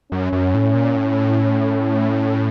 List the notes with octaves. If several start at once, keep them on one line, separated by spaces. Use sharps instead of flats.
F#2 C#4
F#2
A2
A#2
A2